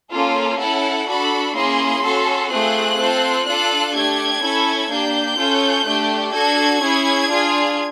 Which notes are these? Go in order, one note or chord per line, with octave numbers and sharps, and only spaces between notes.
A#3 C#4 F4 A4
C#4 E4 A4 F#5
D4 F#4 A4 B5
A#3 C#4 E4 G#4 C6
C#4 F#4 A4
A3 C4 F4 G#4 F#6
C4 F4 A4
D4 F4 A4 F#6
A3 D4 G4 G#6
C#4 E4 A4
A#3 D4 G4 G6
C#4 F4 A4
A3 D4 G4
D4 F#4 A4 G#6
C#4 E4 G#4
D4 F4 G#4